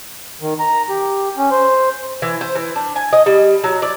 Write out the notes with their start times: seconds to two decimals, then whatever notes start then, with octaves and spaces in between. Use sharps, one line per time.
0.41 D#3
0.59 A#5
0.89 G4
1.37 C#4
1.51 C5
2.22 E3
2.41 C5
2.55 E3
2.76 D4
2.96 G#5
3.13 D#5
3.26 G3
3.64 F#3
3.82 D5